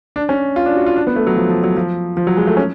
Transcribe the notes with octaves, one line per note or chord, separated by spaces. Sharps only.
D4
C#4
F4
D4
F#4
F4
D4
B3
A3
F#3
F3
F3
F#3
F3
F3
F#3
G#3
A3
C#4